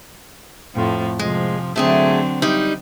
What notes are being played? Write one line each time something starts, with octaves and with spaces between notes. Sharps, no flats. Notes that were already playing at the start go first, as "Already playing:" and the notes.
F2 A2 F3
C3 F3 G#3
D3 F#3 A3 C4 G#4 A4
G3 D#4